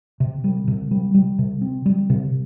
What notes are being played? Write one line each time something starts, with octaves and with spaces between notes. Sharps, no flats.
C3
G3
C3
G3
G3
C3
C4
G3
C3